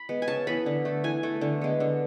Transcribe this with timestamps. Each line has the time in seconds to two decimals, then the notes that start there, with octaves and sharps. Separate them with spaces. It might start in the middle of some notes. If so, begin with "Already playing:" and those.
Already playing: B5
0.09 G#3 B3
0.22 G#5
0.28 C#3 A5
0.47 E3 B3 B5
0.66 D3
0.85 A3
1.04 E3 G#5
1.23 A3
1.41 D3
1.61 G#3 B3
1.80 D3